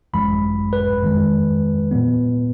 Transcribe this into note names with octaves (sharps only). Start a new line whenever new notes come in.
G#1 F#2 F3 G#3 B5
B4
F2 D#3 G#3
A#2 F3 B3